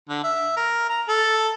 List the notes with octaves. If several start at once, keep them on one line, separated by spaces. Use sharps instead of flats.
D3
E5
A#4
A#5
A4